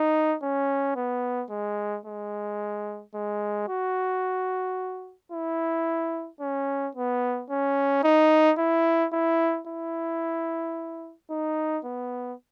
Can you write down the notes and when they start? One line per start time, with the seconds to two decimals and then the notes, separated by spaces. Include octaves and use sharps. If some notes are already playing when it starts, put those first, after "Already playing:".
Already playing: D#4
0.42 C#4
0.96 B3
1.50 G#3
2.05 G#3
3.14 G#3
3.68 F#4
5.32 E4
6.40 C#4
6.95 B3
7.50 C#4
8.03 D#4
8.58 E4
9.12 E4
9.67 E4
11.30 D#4
11.84 B3